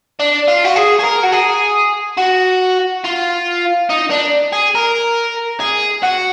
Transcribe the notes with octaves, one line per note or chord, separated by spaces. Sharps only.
D4
F4
F#4
G#4
G#4
A#4
F#4
G#4
F#4
F4
D#4
D4
G#4
A#4
G#4
F#4